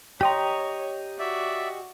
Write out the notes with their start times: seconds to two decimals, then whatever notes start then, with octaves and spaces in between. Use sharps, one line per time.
0.21 G4 C#5 D#5 G5 A#5 C6
1.19 F#4 D5 E5